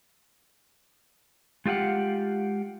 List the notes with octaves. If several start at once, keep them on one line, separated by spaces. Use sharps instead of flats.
G#3 F4 G4 F5 F#5